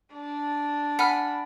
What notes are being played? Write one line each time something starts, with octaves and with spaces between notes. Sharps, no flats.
D4
F#5 G#5 B5 F6